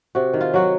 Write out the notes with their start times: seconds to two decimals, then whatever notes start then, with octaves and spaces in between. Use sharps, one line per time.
0.15 C3 F#4
0.33 D#3
0.41 F4
0.54 F#3 F#4